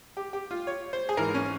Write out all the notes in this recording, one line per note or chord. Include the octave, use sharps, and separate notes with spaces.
G4
G4
F4
C#5
C5
G#4
G#2 E3 A#4
C#4